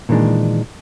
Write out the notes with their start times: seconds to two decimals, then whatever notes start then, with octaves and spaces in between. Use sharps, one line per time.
0.09 A#2 D#3 E3 G#3 D4